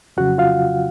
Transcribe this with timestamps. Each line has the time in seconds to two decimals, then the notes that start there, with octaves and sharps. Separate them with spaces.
0.17 F2 C#3 F#3 F#4 F#5
0.38 F4 F5